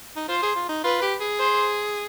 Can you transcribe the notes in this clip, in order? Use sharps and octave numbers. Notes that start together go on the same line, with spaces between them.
D#4
F4 C5
G#4
F4
D#4
F4 B4
G4
G#4
C5